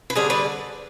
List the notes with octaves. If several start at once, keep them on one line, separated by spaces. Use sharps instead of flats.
B4
D3 G3 D4 G#4 C5
B4 D5